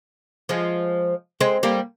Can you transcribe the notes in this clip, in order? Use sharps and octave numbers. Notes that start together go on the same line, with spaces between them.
F3 G#3
G#3 C4
G3 A#3